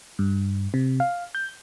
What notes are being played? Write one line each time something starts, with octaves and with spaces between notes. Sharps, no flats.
G2
C3
F5
G6